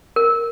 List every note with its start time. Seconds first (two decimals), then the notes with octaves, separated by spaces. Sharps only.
0.16 A#4